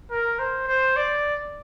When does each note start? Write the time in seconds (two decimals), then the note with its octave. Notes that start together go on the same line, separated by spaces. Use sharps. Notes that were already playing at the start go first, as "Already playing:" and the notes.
0.11 A#4
0.39 C5
0.67 C5
0.96 D5